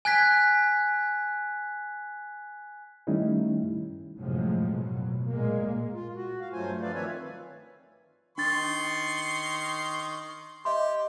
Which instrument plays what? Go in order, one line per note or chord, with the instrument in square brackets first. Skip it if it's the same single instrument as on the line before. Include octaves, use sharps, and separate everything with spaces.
[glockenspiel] G#5 F#6 G#6 B6
[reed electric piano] D#3 G3 A3 C#4 D#4 E4
[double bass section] F#2 A2 C3 F3 F#3 G#3
B2 F#3
A#2 G#3 A#3
[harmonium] F4
F#4
F5
G2 F#3 A3 F4 C5 G#5
F3 A3 F4 B4 D5 F5
D#3 C4 B4 C#5 E5 G#5
[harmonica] D#3 C6 C#6 [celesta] D4 A6
[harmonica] G4 [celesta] D#5 E5 C6